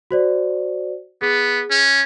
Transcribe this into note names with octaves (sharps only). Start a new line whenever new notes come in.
F#4 C5 D5
B3 G#4
C#4